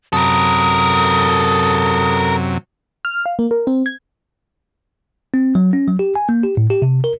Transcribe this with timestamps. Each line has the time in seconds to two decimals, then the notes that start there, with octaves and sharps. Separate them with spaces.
0.13 F#2 C3 F#3 A4 A#4 D#6
3.05 F6
3.26 F5
3.39 A#3
3.51 A#4
3.67 C4
3.86 G#6
5.34 C4
5.55 F#3
5.73 C#4
5.88 F#3
5.99 G4
6.15 G#5
6.29 A#3
6.43 G4
6.57 A2
6.70 G4
6.82 C3
7.04 A#4